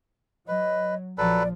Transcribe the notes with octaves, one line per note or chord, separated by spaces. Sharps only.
F#3 B4 D#5
A#1 F3 F#3 A4 B4 D5